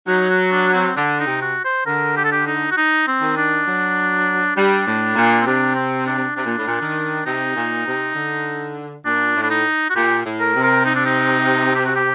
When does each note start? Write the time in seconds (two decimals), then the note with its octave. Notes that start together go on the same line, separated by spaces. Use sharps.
0.07 F#3 D#4
0.30 F#4
0.52 D4
0.74 C4
0.96 D3 D4
1.19 D#4
1.26 C3
1.42 F#4
1.65 C5
1.86 D3 A#4
2.17 G4
2.24 A4
2.32 G4
2.47 D#4
2.71 F#4
2.77 D#4
3.07 C4
3.21 D#3
3.37 D4
3.67 F#3
4.56 G3 D4
4.87 A2
5.16 A#2
5.42 C4
5.46 C3 D4
5.76 C4
6.06 D4
6.36 C3 D4
6.46 A#2
6.57 A2
6.67 A#2
6.81 D#3
7.25 C3 D#4
7.55 A#2
7.86 C3
8.15 D3
9.05 A#2 D4
9.36 A2
9.43 D4
9.50 D#4
9.89 F#4
9.95 A#2 G4
10.25 A2
10.40 A#4
10.55 C3
10.63 A#4
10.85 D#4
10.95 D4
11.05 D#4
11.75 G4
11.85 F#4
11.96 G4